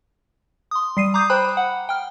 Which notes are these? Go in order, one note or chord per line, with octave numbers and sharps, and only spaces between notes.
C6 D#6
G3 C7 D#7
A#5 D6 D#6 G6
C5 G5 A#5 B5 F#6
F#5
G5 F6